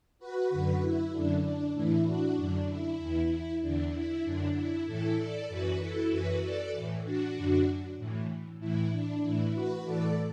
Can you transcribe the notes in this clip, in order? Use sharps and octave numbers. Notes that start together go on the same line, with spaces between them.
F#4 B4
F#2 D3
E4
F#2 D3 D4
D4
A2 E3 E4
D4 F#4
F#2 D3 D4
E4
E2 E3
E2 D3 D4
E4
F#2 D3 D4
E4
A2 E3 E4 A4
A4 D5
F#2 E3 F#4 B4
E4 A4
F#2 E3 F#4 B4
A4 D5
A2 E3
D4 F#4
F#2 D3
A2 E3
A2 E3 E4
D4
A2 E3 E4
F#4 B4
A2 E3 A4 D5